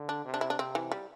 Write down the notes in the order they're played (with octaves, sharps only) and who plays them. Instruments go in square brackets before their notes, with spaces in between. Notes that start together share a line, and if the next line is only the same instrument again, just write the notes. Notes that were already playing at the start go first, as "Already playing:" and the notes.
Already playing: [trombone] D3
[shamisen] D4
[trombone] C3
[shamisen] D4
E4
D4
[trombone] C3 [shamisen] C4
[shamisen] E3
G3